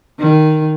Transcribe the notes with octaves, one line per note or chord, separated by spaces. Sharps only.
D#3